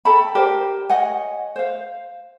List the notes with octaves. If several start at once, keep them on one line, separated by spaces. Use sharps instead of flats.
A4 G5 A5 B5
G4 A#4 C5 D5
C#5 D#5 F#5 G#5
C5 F5